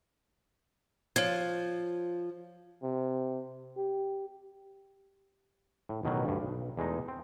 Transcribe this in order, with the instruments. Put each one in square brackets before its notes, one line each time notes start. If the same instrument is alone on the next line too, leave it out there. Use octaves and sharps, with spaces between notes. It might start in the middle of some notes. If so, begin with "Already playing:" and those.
[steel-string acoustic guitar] F3 [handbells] C#5 G#6
[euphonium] C3
G4
[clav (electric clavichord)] A2
A1 B2 D#3 F#3
D2 G2
B1
E2 G#3 A3 D#4
C4